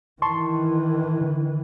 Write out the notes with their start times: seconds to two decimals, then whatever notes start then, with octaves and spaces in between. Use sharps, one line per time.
0.22 D#3 E3 A5 C6 C#6
1.21 D3